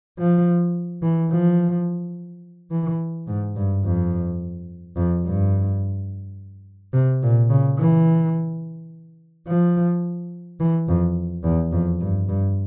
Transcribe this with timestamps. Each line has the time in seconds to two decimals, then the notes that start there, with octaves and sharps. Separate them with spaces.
0.19 F3
1.02 E3
1.31 F3
2.71 E3
3.27 G#2
3.56 G2
3.84 F2
4.97 F2
5.25 G2
6.93 C3
7.23 A#2
7.50 C#3
7.78 E3
9.47 F3
10.60 E3
10.88 F2
11.44 E2
11.72 F2
12.01 G2
12.29 G2